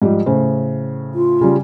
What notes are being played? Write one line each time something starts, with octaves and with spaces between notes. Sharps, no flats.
G#2 F3 G3
A2 C#3 C5
F4
C#3 G3